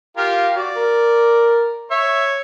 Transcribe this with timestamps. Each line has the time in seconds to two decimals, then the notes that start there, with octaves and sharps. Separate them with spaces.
0.17 F4 G4 A#4 F5
0.57 F#4 D5
0.76 A#4
1.91 C#5 E5